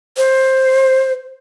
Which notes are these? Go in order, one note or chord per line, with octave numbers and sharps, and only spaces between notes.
C5